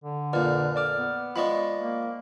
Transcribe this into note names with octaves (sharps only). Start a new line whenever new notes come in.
D3
F2 A#2 B4 D5 F6
D5 D6 F6
B3
F3 G#3 C#4 D5 D#5 B5
A#3